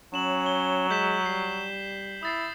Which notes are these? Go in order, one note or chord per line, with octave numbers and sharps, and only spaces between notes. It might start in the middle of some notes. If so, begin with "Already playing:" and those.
F#3 C#4 E7 F#7
G7
G#3 G6 B6 E7
G3 C7
E4 D#6 A6 C7